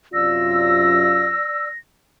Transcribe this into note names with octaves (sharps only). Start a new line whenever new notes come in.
F#2 C3 F4 D5 E6 A#6